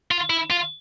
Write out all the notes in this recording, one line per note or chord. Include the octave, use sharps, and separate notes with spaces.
F4
E4
F4